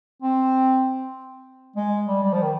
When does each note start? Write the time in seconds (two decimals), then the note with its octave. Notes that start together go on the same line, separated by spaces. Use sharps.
0.22 C4
1.76 G#3
2.08 G3
2.23 G3
2.33 F3
2.43 D#3